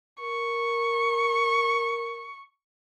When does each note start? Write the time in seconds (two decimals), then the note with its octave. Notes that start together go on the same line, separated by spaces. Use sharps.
0.21 A#4 C#6